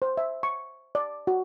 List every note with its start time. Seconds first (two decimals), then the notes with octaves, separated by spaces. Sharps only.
0.02 C5
0.17 E5
0.43 C#6
0.95 D5
1.27 F#4